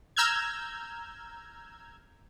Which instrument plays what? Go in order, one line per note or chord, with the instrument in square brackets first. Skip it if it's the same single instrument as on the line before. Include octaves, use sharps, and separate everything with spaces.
[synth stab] A#5 E6 F6 G6 G#6